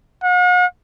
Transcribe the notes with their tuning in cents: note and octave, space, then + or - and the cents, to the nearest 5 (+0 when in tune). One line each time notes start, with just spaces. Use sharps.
F#5 -45